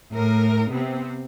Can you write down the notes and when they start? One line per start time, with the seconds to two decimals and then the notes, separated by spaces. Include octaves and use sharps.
0.12 A2 A#4
0.70 C3 B3 C4